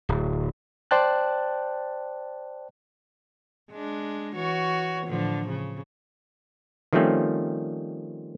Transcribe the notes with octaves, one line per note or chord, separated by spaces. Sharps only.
D1
C5 D5 G5 A5 F#6
G#3 D4
E3 F#4 C#5
A2 D3 F3
C#3
D#3 F3 G3 A3 C4 C#4